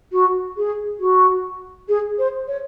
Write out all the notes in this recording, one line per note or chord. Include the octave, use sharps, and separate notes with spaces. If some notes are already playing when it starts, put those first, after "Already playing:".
F#4
G#4
F#4
G#4
C5
C#5